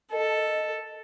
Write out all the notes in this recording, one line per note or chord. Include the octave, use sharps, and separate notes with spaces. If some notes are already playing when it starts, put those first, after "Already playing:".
A4 D#5